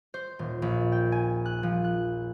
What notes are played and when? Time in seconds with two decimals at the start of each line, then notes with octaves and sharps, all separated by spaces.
0.14 C5
0.39 D#1
0.62 A#1
0.92 G5
1.12 G#5
1.46 F#6
1.63 F3
1.84 F#6